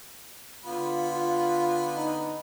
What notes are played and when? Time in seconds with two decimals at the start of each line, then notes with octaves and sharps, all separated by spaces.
0.65 D3 B3 F4 B5
1.10 F4
1.95 D#4